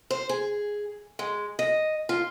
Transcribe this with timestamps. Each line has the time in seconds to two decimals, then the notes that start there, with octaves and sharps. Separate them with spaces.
0.11 C5
0.29 G#4
1.19 G#3
1.59 D#5
2.09 F4